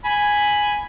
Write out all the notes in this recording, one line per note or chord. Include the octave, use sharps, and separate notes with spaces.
G#5 B5